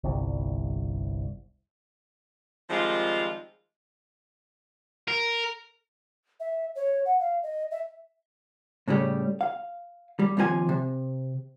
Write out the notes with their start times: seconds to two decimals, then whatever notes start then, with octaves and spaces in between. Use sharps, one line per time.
0.04 G1 C2
2.70 D#3 F3 G3 G#3 C4 F4
5.08 A#4
6.40 E5
6.76 C#5
7.05 F#5
7.20 F5
7.43 D#5
7.71 E5
8.88 A2 C#3 F#3 G3 A3
9.41 F5
10.19 G3
10.37 D#2 C3 F3 A4 G#5
10.69 C3